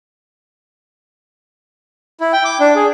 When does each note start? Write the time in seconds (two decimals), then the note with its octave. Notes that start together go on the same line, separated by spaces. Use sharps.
2.21 E4
2.33 G5
2.45 D6
2.60 D4
2.76 G#4